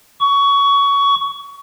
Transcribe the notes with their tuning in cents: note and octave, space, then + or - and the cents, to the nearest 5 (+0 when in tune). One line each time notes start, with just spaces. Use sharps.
C#6 +20